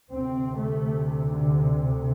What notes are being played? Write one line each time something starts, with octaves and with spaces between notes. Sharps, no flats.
D2 C3 C4
A3
D3